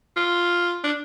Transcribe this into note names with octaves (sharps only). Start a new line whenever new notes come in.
F4
D4